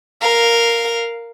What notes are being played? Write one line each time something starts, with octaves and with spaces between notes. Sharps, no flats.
A#4 F5